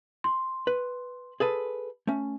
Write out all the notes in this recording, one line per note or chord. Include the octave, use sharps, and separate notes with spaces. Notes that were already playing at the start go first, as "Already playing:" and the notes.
C6
B4
G#4 A4 B4
A3 C#4